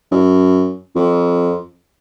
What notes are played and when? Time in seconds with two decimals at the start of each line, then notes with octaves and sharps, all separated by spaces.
0.12 F#2
0.96 F2